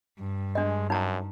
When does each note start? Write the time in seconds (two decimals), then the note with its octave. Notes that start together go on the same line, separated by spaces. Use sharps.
0.19 G2
0.55 G#3 D4 D#5
0.90 F#2 D#4 A#5